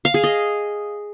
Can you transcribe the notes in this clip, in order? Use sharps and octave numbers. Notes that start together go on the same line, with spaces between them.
F5
G#4
D#5